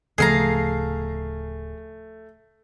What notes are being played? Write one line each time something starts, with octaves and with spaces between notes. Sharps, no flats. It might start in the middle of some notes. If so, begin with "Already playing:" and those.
D1 C#3 F3 A3 G#4 F5 A#5